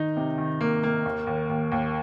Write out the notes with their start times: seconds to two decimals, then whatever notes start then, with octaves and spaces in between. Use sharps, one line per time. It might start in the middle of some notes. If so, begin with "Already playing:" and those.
Already playing: D#3 D#4
0.17 C3
0.38 D#3
0.61 A#3
0.84 A#3
1.05 D#2
1.27 D#2
1.49 D#2
1.72 D#2